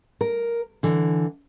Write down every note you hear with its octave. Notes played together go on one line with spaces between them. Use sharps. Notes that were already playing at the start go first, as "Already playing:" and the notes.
A#4
D3 E3